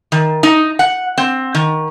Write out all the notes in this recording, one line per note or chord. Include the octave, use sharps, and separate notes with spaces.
D#3
D#4
F#5
C4
D#3